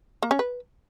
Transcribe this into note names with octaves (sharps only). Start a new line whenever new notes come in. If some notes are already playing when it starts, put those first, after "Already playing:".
A#3
C#4
B4